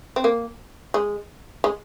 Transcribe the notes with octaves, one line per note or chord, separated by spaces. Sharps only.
C4
A#3
G#3
G#3